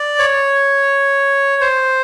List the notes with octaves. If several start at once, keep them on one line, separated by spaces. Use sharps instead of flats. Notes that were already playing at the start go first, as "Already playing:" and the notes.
Already playing: D5
C#5
C5